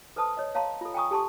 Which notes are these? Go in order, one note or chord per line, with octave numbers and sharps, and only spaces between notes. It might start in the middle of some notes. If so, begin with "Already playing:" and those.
A4 B4 C5 A5 D#6
C#5 D#5
C#5 F5 A5 A#5 C6
F4 A4
G5 G#5 A#5 C#6 D#6
G4 A4 A5 C6 C#6